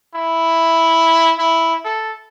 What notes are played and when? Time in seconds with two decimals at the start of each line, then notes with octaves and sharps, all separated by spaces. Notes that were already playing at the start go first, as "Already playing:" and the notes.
0.15 E4
1.39 E4
1.85 A4